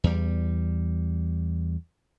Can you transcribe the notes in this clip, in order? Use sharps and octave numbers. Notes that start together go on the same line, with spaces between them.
E2 G3